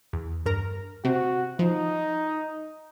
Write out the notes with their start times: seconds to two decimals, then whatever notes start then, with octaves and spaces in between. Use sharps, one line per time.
0.13 E2
0.46 G2 A#4 A#5
1.05 C3 C4 F#4
1.59 F3 D#4